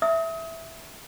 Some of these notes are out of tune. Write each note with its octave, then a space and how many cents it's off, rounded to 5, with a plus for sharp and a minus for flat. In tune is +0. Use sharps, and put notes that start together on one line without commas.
E5 +0 D#6 +35